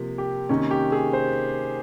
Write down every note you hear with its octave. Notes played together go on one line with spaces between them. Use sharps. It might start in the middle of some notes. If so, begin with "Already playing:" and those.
Already playing: C3 F3 A#3
G4
C3 D#3 A#3 C#4
G4
G#4
C5